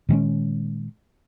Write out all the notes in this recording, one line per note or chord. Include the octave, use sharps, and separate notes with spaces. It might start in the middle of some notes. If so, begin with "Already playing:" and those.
A#2 D#3 G#3 C#4